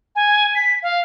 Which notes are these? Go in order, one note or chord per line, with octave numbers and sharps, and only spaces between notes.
G#5
B6
F5